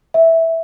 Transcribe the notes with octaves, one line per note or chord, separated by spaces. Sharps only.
E5